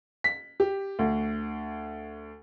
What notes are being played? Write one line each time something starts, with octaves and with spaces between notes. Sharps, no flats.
B6
G4
D2